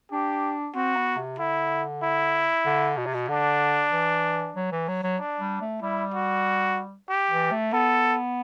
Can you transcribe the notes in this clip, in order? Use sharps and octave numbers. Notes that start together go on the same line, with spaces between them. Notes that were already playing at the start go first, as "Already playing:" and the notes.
D4 G4
C4 F#4
B3
C3
D3 E4
E4
D3
B2
C3
B2
D3 D4
E3
F#3
E3
F#3
F#3
D4
G3
A3
G3 E4
F#4
G4
E3
A3
B3 A4